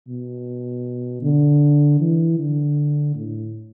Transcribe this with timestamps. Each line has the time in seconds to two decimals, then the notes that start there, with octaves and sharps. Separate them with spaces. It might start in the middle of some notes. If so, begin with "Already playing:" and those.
0.08 B2
1.23 D3
2.00 E3
2.38 D3
3.15 A2